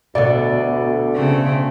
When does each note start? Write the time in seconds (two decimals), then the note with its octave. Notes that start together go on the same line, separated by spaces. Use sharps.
0.15 D2 B2 D3 D5
1.13 C#3 A3 C4